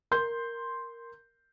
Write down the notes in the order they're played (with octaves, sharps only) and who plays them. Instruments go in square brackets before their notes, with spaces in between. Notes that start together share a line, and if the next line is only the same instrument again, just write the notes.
[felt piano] A#4 C6 G6